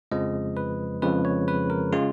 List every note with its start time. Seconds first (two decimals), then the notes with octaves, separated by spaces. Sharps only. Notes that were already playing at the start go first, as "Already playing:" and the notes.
0.12 F2 C#3 F3 G#3 D#5
0.57 B4
1.02 F2 C#3 F3 G#3 B4
1.25 C#5
1.48 B4
1.70 A#4
1.93 C#3 G#3 F4